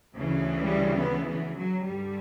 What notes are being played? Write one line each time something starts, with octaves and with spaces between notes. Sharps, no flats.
D2 C#3 E3
G3
B3
E3
F#3
G2 D3 G3